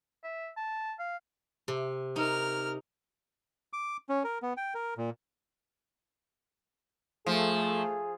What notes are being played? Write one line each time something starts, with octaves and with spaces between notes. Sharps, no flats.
E5
A5
F5
C3
D#4 A#4 F6
D6
C#4
A#4
B3
G5
A#4
A#2
F3 A3 G#4